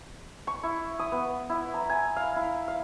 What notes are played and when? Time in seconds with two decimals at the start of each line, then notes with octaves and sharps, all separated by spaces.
0.47 C#6
0.63 E4
0.99 D#6
1.12 B3
1.49 E4
1.74 A#5
1.90 G#5
2.16 F5
2.36 E4
2.68 F5